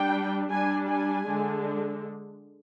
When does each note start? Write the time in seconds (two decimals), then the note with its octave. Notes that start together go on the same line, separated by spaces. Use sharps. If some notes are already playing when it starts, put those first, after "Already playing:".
Already playing: G3 D4 G5
0.51 G3 D4 G#5
0.88 G#5
1.27 D3 G#3 D4